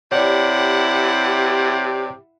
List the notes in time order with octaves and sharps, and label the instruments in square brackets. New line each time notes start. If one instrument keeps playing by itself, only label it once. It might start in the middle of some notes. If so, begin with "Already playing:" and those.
[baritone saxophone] C3 [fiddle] E4 F#5 [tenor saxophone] G4 [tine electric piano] C#5 D5